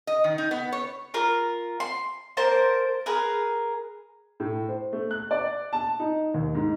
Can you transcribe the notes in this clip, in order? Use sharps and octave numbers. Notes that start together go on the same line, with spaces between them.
D#5
D#3
D#4
B3
C#5
F4 A#4
C6
A#3 A#4 C5 A5
G#4 A#4 B4
A2
C5
A3
F#6
D5
A5
D#4
D#2
G#2